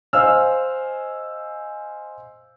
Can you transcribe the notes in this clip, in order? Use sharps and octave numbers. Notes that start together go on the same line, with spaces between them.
C5 D#5 F5 G#5 E6 F6